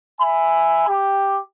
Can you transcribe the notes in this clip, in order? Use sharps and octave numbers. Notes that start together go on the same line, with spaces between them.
E5 G#5 B5
G4